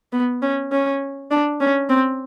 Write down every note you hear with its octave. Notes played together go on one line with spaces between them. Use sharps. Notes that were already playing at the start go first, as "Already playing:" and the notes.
B3
C#4
C#4
D4
C#4
C4